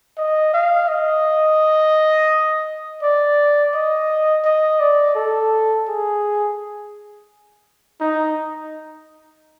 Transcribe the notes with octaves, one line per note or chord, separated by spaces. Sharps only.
D#5
F5
D#5
D5
D#5
D#5
D5
A4
G#4
D#4